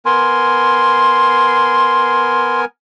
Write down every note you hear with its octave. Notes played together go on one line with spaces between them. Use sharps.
B3 A#4 G#5 C6